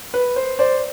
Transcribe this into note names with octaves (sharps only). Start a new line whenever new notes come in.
B4
C5
C5 D5